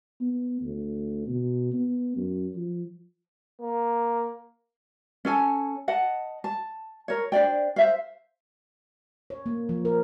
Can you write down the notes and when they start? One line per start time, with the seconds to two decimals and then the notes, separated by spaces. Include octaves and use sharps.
0.21 B3
0.62 D2
1.27 B2
1.72 B3
2.16 F#2
2.56 F3
3.62 A#3
5.25 C#4 A4 G#5 A5
5.88 D#5 F#5 A5
6.44 A5
7.08 A#4 C#5
7.32 D4 C5 D5 G5
7.76 C5 E5 F5
9.30 C#5
9.46 A#3
9.69 F3
9.85 A#4